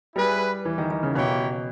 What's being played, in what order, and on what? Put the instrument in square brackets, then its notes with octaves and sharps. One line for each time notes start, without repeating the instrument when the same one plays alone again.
[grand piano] G3 [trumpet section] E4 G#4 B4
[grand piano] E3
D#3
D#3
C#3
[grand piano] B2 [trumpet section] A#3 E4 G4 C#5 G5